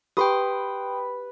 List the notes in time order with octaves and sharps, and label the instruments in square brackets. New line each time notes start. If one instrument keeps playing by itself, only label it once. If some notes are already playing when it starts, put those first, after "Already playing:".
[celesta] G4 [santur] B4 [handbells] G5 C6 D#6